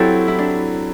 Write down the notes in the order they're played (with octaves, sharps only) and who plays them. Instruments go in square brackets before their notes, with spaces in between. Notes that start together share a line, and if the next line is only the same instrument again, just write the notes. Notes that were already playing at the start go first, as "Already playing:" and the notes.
Already playing: [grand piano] F#3 C4 E4 [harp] G4 A4
[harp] E4
D4